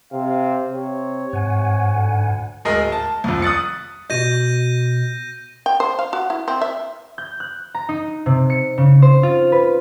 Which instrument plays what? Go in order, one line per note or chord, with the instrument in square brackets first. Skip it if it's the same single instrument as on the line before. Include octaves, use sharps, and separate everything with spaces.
[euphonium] C3 [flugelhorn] F5
[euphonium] C3 [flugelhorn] C#5
[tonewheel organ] G#2 F#5 G#5 [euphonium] C3
[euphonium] D2
[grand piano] D1 G#3 A#4 D#5
A5
C2 F2
D#6 F#6 A6 C#7
[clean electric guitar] B2 F#4 D#5 [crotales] G6 A#6 D#7
[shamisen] G5
C5
F5
F#4
E4
C4
E5
[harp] G6
F#6
A#5
D#4
C3
C#7
C#3
C5
F4
B4